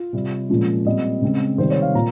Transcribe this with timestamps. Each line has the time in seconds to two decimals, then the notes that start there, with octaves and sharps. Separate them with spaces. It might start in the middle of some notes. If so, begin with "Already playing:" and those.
Already playing: F4
0.13 C3 G3 C4
0.49 A#2 F3 G#3 C#4
0.85 A#2 G3 C4 D#5
1.22 C#3 G#3 C4
1.58 C3 D#3 G3 C4 C5
1.71 C#5
1.82 F5
1.94 A#2 A#5